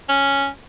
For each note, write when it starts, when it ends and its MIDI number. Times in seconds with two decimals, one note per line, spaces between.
0.09 0.47 61